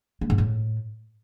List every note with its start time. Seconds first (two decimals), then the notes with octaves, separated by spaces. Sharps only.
0.21 A#3
0.30 G#2
0.38 A2